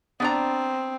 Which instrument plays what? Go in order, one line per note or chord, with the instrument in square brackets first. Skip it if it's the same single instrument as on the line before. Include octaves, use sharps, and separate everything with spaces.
[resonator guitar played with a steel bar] B3 D4 A#5 [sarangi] C4